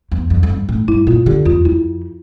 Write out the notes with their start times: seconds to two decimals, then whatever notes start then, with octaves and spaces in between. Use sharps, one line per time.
0.12 E2
0.30 F2
0.43 F2
0.50 G2
0.69 A2
0.88 G2 E4
1.07 A#2 F4
1.26 D3 G4
1.45 E2 F4
1.65 F2 E4